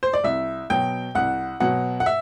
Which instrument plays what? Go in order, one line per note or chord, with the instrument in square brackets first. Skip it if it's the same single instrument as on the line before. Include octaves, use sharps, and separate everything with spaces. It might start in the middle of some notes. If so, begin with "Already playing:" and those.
[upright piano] C5
D5
C2 E5
B2 F#3 G5
C2 F#5
B2 F#3 F#5
F#5
E5